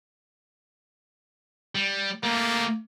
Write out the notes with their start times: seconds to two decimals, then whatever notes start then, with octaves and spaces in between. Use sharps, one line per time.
1.75 G3
2.23 A3 A#3 G4